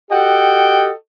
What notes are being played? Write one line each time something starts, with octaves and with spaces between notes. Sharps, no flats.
F#4 G4 A4 D#5 F#5 G5